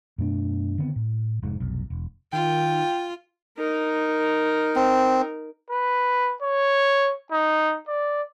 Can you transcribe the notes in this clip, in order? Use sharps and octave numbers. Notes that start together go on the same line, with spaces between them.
F#2 B2 A3 D4
D3 D#3 B3 C4
A2
F1 G#2
F1 B1
E1
D#3 F4 G5
D#4 A#4
C4
B4
C#5
D#4
D5